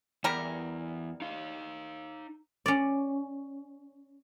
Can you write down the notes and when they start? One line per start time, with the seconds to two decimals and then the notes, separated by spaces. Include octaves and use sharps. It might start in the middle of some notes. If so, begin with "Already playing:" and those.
0.24 E2 G3 G4 A#4
1.22 D#4 F5
2.66 C#4 D5